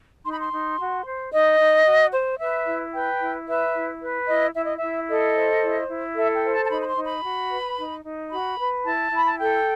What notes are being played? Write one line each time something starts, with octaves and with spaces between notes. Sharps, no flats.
D#4 C6
B5
C6
D#4
F#4
C5
D#4 D#5
D#4
F#4
C5
B4 E5
E4
B4 G5
E4
B4 E5
E4
B4
E4 D#5
E4 E5
D#5
E5
E4
A4 D#5
C5
E4
E4
A4 E5
G5
C5
A5
A5
D#4 B5
B5
C6
D#4
B5
F#4
B4
D#4
D#4
F#4 B5
B4
E4 A5
E4 B5
A5
A4 G5